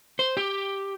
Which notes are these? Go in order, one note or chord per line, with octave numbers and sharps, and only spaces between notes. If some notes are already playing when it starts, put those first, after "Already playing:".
C5
G4